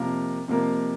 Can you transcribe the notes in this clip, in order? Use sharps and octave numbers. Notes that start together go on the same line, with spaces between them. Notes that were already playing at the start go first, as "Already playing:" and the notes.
Already playing: F2 C3 A#3 F4 A#4
F2 C3 A#3 F4 A#4